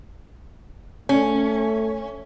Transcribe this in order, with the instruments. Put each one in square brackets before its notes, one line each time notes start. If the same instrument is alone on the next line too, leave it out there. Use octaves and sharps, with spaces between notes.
[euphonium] A3 [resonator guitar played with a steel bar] C#4